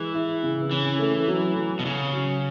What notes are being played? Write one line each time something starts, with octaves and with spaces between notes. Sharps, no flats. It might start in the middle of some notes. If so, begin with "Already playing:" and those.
Already playing: E3 G#3
E4
C#3
E3 C#4
A3
F#3
F#3
B2
C#3 C#4
F#3